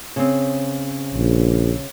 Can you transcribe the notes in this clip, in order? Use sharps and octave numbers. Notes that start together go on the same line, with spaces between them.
C#3 C4
A#1